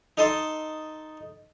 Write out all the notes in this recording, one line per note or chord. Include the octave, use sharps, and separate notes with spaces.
D#4 A4 D#5 A5 C6